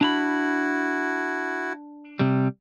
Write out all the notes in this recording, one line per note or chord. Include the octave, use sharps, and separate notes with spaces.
D4 E4 F#4 A#5 B5
C3 G3